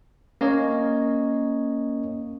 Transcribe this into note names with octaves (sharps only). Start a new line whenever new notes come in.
A#3 C#4 A#4 C#5 D#5